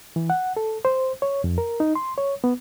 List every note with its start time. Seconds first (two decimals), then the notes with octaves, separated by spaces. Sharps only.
0.16 E3
0.30 F#5
0.57 A4
0.85 C5
1.22 C#5
1.44 F2
1.58 A#4
1.80 D#4
1.95 C6
2.18 C#5
2.44 B3